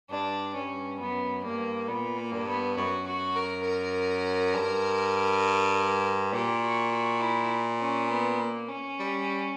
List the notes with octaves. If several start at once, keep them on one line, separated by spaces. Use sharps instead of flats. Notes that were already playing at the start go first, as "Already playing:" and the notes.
G2 D4
G2 C#4
F#2 B3
G2 A#3
A#2 B3
A#3
G2
B3
F#2 F#4
F#4
A#4
A#4
G2
A#2 G4
F#4
F#4
E4
C#4
B3
A#3
C#4
G3